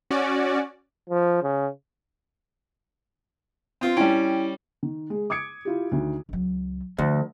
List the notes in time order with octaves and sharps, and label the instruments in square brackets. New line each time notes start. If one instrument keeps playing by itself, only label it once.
[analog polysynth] C#4 F#4 D5
[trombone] F3
C#3
[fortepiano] C4 F4
[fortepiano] G3 C#4 [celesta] E4 G5 D7
[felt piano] D#3
G#3 G#4
D6 D#6 G#6 C#7 D7
E4 F4 G4
D2 D#3
[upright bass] C#2 F#3
[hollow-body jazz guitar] D2 [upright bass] F3